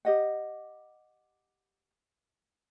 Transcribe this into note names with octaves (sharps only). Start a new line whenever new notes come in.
G4 D#5 F#5